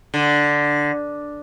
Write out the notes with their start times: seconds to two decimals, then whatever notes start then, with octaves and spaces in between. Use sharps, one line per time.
0.14 D3